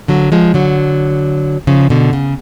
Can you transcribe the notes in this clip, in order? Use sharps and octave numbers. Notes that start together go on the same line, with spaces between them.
D3 F#3
F3 G#3
D3 F#3
C#3 F3
B2 D3
C#3